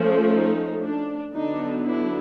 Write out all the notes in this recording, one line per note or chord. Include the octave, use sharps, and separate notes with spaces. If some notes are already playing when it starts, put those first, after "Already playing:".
Already playing: F3 A3 C#4
D#4
D4
D3 F#3 B3 D4 D#4
D4 E4